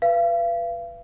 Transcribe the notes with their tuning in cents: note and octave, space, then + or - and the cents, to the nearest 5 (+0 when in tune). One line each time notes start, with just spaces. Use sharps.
B4 +0 F5 -40